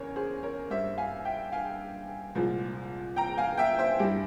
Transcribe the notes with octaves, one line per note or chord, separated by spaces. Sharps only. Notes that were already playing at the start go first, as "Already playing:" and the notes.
Already playing: E2 C#3 A#4 C#5
G#4 C5
A#4 C#5
G2 G3 C5 E5
F5 G#5
E5 G5
F5 G#5
C2 A#2 F3 G#3
G5 A#5
F5 G#5
E5 G5
C5 E5
G2 G3 E4 G4